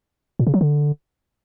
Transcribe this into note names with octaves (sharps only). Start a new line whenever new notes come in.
A#2
C#3
F#3
D3